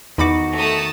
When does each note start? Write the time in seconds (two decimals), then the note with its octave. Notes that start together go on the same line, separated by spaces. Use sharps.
0.18 E2 D#3 D#4 F#4 B5 D6
0.57 A3 A5 D#6